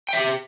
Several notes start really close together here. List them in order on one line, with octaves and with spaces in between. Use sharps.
G5 E5 G4